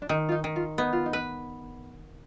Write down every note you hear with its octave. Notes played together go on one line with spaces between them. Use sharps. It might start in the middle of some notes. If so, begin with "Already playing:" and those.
D4
D#3 D#4
F4
D#4
D#3
F4
B3 D#4
F4
D#4
B4